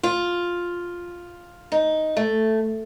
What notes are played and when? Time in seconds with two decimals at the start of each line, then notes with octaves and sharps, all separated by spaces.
0.03 F4
1.72 D#4
2.17 A3